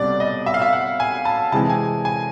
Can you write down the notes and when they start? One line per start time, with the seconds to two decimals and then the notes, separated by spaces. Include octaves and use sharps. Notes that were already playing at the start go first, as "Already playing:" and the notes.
Already playing: C2 B2 G3 D5
0.20 D#5
0.46 E5
0.54 F5
0.62 E5
0.73 F#5
1.00 G#5
1.25 A5
1.52 C3 E3 G#3 A5
1.69 G#5
2.05 G#5